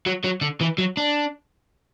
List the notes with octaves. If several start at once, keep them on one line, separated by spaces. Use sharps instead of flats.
F#3
F#3
D3
E3
F#3
D4